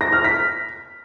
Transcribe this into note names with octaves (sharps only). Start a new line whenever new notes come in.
A#6
F6
B6